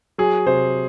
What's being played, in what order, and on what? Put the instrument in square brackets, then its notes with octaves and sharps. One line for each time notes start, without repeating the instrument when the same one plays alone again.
[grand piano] F#3 G#4
C3 C5